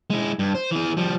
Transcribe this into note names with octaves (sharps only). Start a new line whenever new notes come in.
G#3 E4
G2
C5
E3 G#4
F3 G3